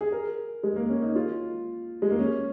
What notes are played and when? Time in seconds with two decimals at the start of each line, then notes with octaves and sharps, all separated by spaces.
0.01 G#4
0.12 A#4
0.63 G#3
0.76 A#3
0.89 C#4
1.02 D#4
1.16 F4
2.02 G#3
2.10 A#3
2.19 C#4